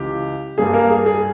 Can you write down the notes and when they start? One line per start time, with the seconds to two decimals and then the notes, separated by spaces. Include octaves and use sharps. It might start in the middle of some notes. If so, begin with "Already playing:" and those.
Already playing: C#2 C#3 E3 G4
0.58 G2 G3 A#3 G#4
0.74 A#3 A#4
0.90 G#4
1.06 G#4